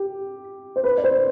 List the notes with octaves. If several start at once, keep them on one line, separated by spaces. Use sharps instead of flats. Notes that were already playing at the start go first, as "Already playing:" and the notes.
Already playing: G4
C5
B4
D5
C5